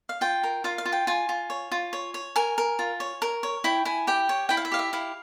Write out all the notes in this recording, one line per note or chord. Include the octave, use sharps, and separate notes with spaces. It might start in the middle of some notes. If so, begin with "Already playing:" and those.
F5
F4 G5
A#4
F4 F5
F5
F4
G5
F4 G#5
F4
C#5
F4
C#5
C#5
A#4 G#5
A#4
F4
C#5
A#4
C#5
E4 G5
E4 G#5
G4 G5
C#5
E4 G5
F5
E5
G4 F5
E5
E4 F5